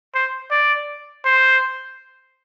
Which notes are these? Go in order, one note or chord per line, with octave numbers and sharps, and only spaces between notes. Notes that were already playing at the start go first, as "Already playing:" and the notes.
C5
D5
C5